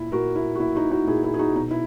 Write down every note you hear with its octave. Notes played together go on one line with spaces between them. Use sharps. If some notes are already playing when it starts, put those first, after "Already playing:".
Already playing: A#2 E4
A#2 F#4 A#4
E4
F#4
A#2 E4
D#4 F#4
D#4 F#4
A#2 E4 G#4
E4 G#4
G#4
D#4 F#4
B2 D#4
E4